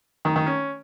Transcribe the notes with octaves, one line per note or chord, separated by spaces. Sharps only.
D#3
D#3
C#4